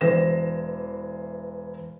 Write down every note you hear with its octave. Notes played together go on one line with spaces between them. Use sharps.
E1 E3 C5 A#6 E7